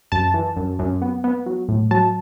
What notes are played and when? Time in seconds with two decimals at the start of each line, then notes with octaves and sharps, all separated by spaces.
0.12 F#2 A5
0.34 E3
0.56 F#2
0.79 F#2
1.02 B3
1.24 B3
1.46 F#3
1.69 A2
1.91 F#3 A5